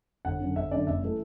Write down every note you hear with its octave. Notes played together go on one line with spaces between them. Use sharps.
G1 F#5
F#2 D3
G1 E5
F#2 D3 D5
F#1 E5
E3 A3